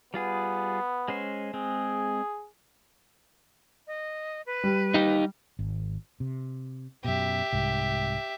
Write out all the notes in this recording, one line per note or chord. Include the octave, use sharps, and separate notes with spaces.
G3 B3 F4 G#4
G#3 C#4 C5
G#3 C4 G#4
D#5
B4
G3
D#4 G4
G#1
C3
F#2 B2 G4 E5
C2 G#2